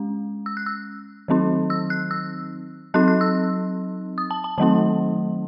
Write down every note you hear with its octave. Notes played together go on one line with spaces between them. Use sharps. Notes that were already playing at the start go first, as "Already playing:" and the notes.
Already playing: G#3 C#4
E6
F#6
E6
D#3 F#3 C4 D#4
E6
F#6
E6
F#3 C4 D#4 F#6
F#6
E6
D#6
A5
A5
D#3 F#3 A3 C4 D#4 A5